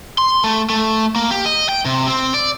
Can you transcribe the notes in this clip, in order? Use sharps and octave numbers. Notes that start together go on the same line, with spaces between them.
C6
A3
A3
A#3
G4
D#5
G5
C3
C4
D5